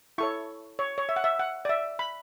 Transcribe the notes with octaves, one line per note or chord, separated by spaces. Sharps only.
E4 A4 C#5 C#6
C#5
C#5
E5
F#5
E5
F#5
D5
E5
B5